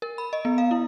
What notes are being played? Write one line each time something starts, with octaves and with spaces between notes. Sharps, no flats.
A#4
B5
D#5
B3
F5
E4